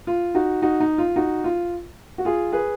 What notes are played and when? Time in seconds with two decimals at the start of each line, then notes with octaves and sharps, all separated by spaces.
0.07 F4
0.35 D#4 F#4
0.62 D#4 F#4
0.80 D#4
0.98 F4
1.16 D#4 F#4
1.44 F4
2.18 F#4
2.25 F4 G#4
2.52 G#4 B4